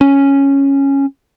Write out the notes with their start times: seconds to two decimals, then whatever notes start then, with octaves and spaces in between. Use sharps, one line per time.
0.01 C#4